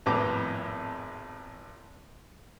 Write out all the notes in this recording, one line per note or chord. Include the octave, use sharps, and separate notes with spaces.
G#1 F2 A2 B3 D6